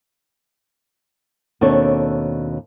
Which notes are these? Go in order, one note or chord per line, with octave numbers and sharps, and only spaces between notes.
D#2 B2 C4 D4 A4 C#5